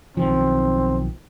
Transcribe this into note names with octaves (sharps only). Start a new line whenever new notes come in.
B1 D#3 F3 C4